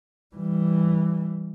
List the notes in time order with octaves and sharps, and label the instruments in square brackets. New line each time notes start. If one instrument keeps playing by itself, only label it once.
[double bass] E3 G3